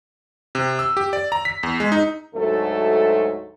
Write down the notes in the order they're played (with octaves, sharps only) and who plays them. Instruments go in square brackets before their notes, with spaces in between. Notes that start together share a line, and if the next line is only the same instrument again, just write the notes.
[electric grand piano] C3
E6
G4
D5
A#5
B6
E2
G#3
D#4
[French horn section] D2 G#2 F#3 A3 A4